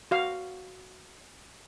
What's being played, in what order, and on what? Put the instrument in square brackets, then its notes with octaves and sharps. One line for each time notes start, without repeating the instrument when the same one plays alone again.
[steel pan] F#4 F5